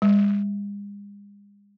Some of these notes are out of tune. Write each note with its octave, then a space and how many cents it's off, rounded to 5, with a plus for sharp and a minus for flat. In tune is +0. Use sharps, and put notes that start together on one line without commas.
G#3 -45